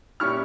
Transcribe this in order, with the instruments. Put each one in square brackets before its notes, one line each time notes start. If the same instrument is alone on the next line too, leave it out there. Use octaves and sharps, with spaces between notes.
[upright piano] A#2 G3 C#4 E4 C#6 F6